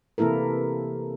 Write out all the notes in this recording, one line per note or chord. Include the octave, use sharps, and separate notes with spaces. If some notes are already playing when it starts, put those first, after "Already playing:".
C3 E3 A#3 E4 A4 A#4